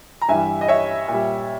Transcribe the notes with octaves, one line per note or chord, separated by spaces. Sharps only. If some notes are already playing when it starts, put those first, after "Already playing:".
A#5
G2 E3 G3 E5 G#5
D#5
C#5 E5
A#2
G3